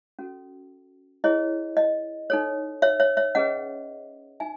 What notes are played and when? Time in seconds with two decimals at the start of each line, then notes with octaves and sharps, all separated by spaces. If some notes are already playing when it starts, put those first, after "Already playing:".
0.19 C#4 F#4 A4
1.24 E4 G#4 C#5 D#5
1.77 D#5
2.30 D#4 A4 C#5
2.82 C#5 E5
3.00 C#5 E5
3.17 C#5 E5
3.35 C#4 G#4 B4 D#5 F#5
4.40 D#4 E5 G#5